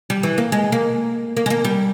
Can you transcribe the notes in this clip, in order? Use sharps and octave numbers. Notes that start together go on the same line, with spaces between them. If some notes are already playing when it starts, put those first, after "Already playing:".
G3
E3
A#3
G#3
A#3
A#3
G#3
A#3
G3